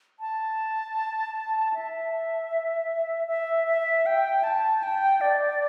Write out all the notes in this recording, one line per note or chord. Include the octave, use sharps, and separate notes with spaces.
A5
E5
E5
E5
G5
A5
G5
D5